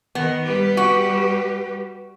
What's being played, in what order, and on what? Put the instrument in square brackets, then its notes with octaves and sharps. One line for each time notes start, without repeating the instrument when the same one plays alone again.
[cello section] D#3 [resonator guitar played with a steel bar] B3
[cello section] G3 G4 B4
[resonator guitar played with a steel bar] F#4